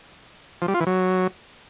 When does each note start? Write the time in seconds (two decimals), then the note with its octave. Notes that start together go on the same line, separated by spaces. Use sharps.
0.62 F3
0.68 G3
0.74 F4
0.81 E3
0.87 F#3